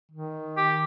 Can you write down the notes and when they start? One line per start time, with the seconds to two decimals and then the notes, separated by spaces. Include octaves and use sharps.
0.12 D#3
0.57 G4